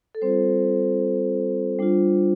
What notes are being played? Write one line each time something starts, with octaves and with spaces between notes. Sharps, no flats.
A4
G3 C4 F4 C5
G3 D4 F4